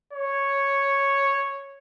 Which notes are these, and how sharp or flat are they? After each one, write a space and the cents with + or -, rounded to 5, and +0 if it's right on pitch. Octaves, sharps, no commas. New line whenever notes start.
C#5 -5